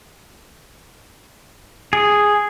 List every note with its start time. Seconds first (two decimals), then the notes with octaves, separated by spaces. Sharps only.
1.93 G#4